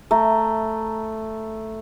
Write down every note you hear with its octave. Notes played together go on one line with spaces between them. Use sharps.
A3 A#5